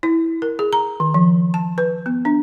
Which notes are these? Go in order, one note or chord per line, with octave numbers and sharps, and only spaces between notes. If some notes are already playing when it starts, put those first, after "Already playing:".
E4
A#4
G#4
A#5
D#3
F3
A5
B4
B3
D4